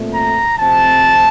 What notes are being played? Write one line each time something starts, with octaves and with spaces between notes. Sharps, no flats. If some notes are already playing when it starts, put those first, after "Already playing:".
Already playing: A#2 A3 C4
A#5
C3 F3 A3 C4 A5